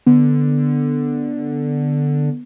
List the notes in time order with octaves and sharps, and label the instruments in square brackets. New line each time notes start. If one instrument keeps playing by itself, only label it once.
[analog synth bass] D3 [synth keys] B3